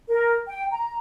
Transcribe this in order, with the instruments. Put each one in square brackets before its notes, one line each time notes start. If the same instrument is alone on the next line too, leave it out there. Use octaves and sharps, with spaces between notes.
[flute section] A#4
G5
A#5